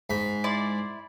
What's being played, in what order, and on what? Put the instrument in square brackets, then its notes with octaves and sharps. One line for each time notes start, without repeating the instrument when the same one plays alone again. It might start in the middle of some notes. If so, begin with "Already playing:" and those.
[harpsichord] G#2 B5
[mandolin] E4 D5 C6